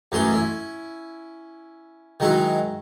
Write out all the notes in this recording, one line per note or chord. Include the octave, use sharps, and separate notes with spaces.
F#2 E3 F#3 A3 C#4 C6
C#4 E4
D#3 F#3 G#3 D#4 E4 F#4